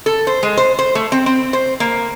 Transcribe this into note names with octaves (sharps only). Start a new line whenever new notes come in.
A4
C5
G#3
C5
C5
A3
C4
C4
C5
A#3